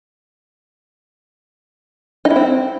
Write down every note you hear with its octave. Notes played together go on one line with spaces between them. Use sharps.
D#4
E4
C4